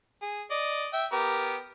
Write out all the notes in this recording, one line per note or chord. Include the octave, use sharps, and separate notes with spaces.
G#4
D5 D#5
E5 G5
B3 G4 A#4